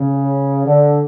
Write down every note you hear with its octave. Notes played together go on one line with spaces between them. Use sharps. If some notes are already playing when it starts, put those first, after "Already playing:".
Already playing: C#3
D3